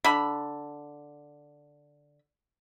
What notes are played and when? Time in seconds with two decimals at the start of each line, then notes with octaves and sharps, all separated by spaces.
0.04 D3 B5